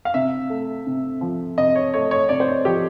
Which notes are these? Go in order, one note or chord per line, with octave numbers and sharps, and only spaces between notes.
F5
C3 E5
A3
C3
F3
C3 D#5
C#5
A3 C#5
C#5
C3 D5
C5
C#5
F3 G4